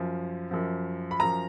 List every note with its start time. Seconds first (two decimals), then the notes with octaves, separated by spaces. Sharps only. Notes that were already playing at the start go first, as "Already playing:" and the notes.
Already playing: F#2 F3
0.51 F#2 F3
1.11 B5
1.20 F#2 F3 A#5